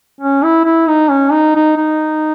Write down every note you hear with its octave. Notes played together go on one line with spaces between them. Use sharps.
C#4
E4
E4
D#4
C#4
D#4
D#4
D#4